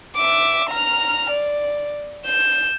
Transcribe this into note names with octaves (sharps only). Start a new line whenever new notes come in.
E5 D6
A#5 F6
D5
G6 E7